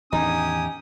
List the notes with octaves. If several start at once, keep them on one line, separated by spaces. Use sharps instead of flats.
E2 A2 D#3 C#4 D#4 G4 G#5 D#6